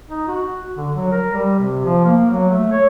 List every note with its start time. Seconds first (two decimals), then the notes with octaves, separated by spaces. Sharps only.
0.09 D#4
0.28 F#4
0.77 D3
0.95 F#3
1.12 A#4
1.34 G3
1.59 C3
1.85 F3
2.05 A#3
2.30 F#3
2.50 A3
2.72 C#5